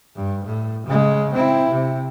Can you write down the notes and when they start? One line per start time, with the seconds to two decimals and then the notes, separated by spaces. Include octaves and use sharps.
0.16 G2
0.45 A2
0.87 C#3 G#3
1.33 C4 E4
1.71 C3